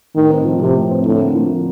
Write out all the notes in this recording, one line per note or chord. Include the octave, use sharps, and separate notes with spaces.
A2 D#3
C4
F3
A2 C3
A2
C4
A2 D3
A#3
F3
D3